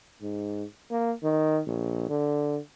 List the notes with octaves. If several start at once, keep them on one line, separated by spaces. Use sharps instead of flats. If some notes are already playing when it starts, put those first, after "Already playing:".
G#2
A#3
D#3
A#1
D3